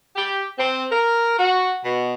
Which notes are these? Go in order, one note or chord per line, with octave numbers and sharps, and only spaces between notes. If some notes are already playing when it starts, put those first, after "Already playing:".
G4
C4
A#4
F#4
B2